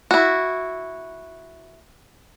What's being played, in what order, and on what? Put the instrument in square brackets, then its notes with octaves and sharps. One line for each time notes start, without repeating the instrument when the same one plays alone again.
[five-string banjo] E4 F#4